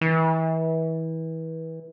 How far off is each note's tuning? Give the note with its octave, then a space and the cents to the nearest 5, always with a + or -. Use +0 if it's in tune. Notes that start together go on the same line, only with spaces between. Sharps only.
E3 -30